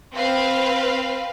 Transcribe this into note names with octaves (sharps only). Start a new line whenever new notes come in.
C4 B4 F5